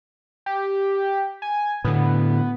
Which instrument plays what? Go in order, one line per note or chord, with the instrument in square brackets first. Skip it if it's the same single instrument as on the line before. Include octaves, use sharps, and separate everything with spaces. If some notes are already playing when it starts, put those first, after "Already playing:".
[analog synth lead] G4
G#5
[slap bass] A2 D3 [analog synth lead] B3